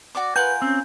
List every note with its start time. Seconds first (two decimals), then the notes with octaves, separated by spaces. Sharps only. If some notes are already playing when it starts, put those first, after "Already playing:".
0.15 F#4 D5 D6
0.36 F4 A#4 B4 F#5 G#5 G6
0.62 C4 C#4